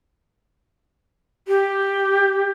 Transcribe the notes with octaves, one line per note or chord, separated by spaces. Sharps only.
G4